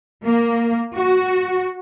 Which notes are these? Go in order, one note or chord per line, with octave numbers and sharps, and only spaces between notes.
A#3
F#4